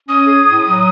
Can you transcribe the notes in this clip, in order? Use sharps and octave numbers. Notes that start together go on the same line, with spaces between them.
C#4 D#6
G#4
A2
F#3